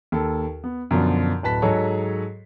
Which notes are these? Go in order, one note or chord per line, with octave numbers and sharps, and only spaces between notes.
D#2 A4
B3
F#2 B2 D3 F3
D1 B4 A5 B6
G#2 F#3 G#4 A4 C#5 D#5